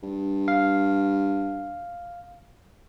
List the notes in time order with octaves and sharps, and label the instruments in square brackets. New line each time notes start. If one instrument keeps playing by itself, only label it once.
[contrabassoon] G2
[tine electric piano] F5